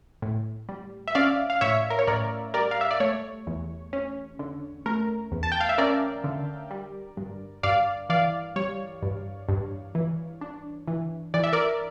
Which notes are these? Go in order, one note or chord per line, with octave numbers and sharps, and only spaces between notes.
A2
G3
E5
C#4 D5 F5
F5
A2 C#5 E5
A#4
C#5
A2 A#4 D5
G3 A#4 D5
F5
E5
D5
A3 C#5
E2
C#4
D3
A3 A#4
E2
A5
G5
F5
E5
C#4 A#4 D5
D3
G3
G2
G2 D5 F5
E3 D5 F5
G3 C#5
G2
G2
E3
D4
E3
E3 D5
E5
A#4 D5